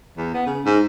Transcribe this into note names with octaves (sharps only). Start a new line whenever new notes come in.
E2
B3
C#3
G#2